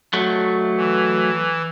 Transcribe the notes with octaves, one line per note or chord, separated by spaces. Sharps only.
F#3 A3
E3